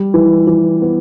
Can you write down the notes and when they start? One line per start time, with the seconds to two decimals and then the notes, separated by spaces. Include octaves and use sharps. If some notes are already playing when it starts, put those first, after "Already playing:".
Already playing: G3
0.14 E3
0.47 E3
0.82 B3